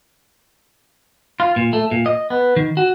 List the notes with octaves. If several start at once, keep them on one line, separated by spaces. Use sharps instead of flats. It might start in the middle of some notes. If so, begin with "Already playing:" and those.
F4
A#2
A3
A#2
D#5
B3
D#3
F#4